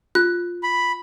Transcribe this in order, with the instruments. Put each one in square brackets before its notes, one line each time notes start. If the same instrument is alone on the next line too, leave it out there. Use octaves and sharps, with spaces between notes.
[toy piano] F4 [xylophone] F#6
[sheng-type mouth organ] B5